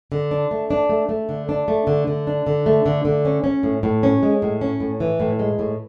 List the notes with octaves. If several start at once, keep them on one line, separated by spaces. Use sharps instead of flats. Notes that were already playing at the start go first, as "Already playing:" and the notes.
D3
D4
A3
D4
A3
A3
D3
D4
A3
D3
D3
D4
D3
A3
D3
D3
C#4
C#4
A2
A2
C#4
G#3
A2
C#4
A2
E3
A2
G#3
A2